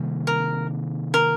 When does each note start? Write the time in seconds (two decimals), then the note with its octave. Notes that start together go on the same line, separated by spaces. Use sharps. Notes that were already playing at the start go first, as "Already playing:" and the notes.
Already playing: C3 D#3 G3 A#3
0.27 A#4
1.14 A#4